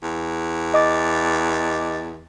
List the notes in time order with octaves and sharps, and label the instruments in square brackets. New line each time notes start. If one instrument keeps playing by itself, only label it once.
[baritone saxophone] E2
[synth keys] D#5 D6 A6